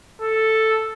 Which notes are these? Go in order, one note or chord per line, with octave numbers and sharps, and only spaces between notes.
A4